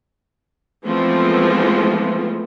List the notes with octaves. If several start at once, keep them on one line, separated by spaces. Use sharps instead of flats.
E3 F3 G#3 A3 B3 C4